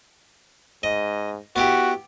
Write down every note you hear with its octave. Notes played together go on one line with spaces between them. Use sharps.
G#2 D#5
B3 E4 F#4 G4